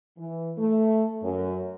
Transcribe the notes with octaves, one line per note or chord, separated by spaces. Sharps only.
E3
A3
F#2